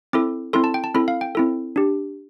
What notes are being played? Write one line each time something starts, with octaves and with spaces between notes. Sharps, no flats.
C4 E4 A4 D6
C4 E4 A4 C6
A5
G5
A5
C4 E4 A4 B5
F5
G5
C4 E4 A4
D4 G4